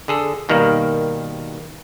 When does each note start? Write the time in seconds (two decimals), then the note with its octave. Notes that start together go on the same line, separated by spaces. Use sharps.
0.08 D3 G#4 A4
0.49 B2 D#3 G3 A#3 F#4